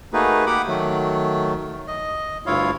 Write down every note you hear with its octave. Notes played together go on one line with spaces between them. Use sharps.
A3 A#3 D#4 F#4 G#4 B4
G4 F#5 B5 D6
D#3 F#3 A3
D#5
D2 G2 E4 F4 C#5 F5